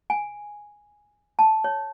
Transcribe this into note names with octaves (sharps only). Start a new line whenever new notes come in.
G#5
A5
C#5